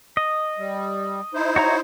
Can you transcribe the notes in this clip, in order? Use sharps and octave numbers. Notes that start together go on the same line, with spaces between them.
D#5
G3
D#4 E4 C5
F#4 C#5 A#5